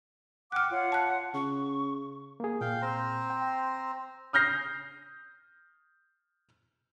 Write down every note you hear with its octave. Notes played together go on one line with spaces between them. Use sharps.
F#5 G5 D6 F6 F#6
F4 C#5 F#5
A5 F#6
C#3 C#6
A#3 G#4
A#2 F5 G5
C4 C5 A#5
G5
D#6 F6 G6 A#6 C7